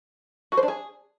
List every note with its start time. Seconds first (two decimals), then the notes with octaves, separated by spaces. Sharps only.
0.52 F#4
0.57 C5
0.63 D4
0.68 G#4